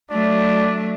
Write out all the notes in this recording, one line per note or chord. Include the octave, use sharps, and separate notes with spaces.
F#3 A3 D4